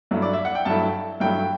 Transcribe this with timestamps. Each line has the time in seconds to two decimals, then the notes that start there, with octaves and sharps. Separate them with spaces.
0.11 G2 F#3 A3 E4
0.22 D5
0.33 E5
0.45 F#5
0.55 G5
0.65 G2 F#3 A3 E4 A5
1.20 G2 F#3 A3 E4 G5